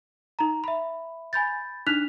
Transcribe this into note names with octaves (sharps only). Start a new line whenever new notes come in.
D#4 A#5
E5 B5
G#5 B5 G6 A6
D4 D#4 F6 F#6 B6 F7